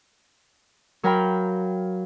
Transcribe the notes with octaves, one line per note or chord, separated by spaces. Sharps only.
F#3 A#4 F5 G5 B5